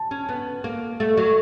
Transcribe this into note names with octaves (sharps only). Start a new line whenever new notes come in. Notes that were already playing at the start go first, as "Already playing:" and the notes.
Already playing: A5
C#4
B3
A#3
A3
F#3